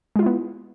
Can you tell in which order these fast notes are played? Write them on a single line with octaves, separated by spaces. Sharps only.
G#3 F4 E4 B3